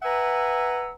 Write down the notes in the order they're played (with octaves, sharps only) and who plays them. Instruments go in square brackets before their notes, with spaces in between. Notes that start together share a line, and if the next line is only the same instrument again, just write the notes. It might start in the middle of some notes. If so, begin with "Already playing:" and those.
[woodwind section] B4 E5 F#5 G#5 A#5 E6